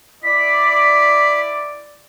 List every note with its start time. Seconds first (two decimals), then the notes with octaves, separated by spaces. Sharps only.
0.23 E4 D5 B6